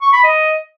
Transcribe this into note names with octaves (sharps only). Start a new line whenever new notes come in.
C#6
B5
D#5